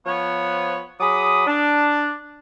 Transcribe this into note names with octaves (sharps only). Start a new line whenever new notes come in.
F3 B3 C#5
F#3 G#4 B5 D6 D#6
D4